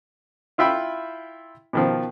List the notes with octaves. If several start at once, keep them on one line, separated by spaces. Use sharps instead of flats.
E4 F4 E5 G5 B5
B2 D#3 F3